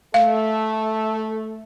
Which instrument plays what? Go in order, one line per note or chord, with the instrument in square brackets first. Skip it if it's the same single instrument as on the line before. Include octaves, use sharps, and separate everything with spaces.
[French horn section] A3 [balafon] F5